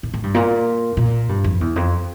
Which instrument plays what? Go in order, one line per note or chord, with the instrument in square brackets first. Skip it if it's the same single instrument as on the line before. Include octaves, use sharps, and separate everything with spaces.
[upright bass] A2
A2
G2
A#2
A#2
G2
F2
E2
F2